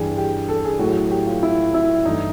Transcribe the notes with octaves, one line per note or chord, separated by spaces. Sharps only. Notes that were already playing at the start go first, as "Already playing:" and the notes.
Already playing: G2 E3 G3 G#4
G4
A4
G#4
A2 F#3 A3 F#4
G4
F4
E4
E4
G2 E3 A3 D#4